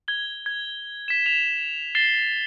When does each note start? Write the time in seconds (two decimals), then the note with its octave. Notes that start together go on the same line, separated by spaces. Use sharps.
0.08 G#6 G7
0.46 G#6
1.08 B6 E7
1.26 B6 E7 F7
1.95 A6 C7 E7 G7